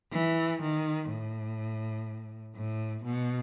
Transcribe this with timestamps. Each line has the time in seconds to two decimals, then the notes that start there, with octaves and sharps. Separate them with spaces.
0.13 E3
0.62 D#3
1.10 A2
2.56 A2
3.04 B2